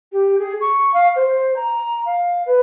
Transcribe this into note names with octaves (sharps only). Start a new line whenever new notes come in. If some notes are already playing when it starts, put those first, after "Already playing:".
G4
G#4
C#6
F5
C5
A#5
F5
B4